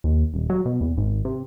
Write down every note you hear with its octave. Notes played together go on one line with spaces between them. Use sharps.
D#2
D#1
F#3
B2
E2
G#1
C3